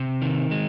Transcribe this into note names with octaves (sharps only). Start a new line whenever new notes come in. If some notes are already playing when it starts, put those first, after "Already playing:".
Already playing: C3
D#3
G#3